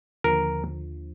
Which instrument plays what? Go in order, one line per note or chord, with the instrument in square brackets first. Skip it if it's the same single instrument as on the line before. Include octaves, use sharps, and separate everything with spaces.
[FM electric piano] D#2 D3 F3 [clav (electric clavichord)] A#4